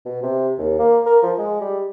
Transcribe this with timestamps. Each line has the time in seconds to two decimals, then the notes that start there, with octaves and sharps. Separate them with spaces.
0.06 B2
0.23 C3
0.58 D#2
0.79 A#3
1.06 A#4
1.23 F3
1.38 G#3
1.61 G3